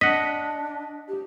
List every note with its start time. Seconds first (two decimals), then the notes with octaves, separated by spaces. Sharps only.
0.01 D4 D#5 F#5 B6
1.08 G4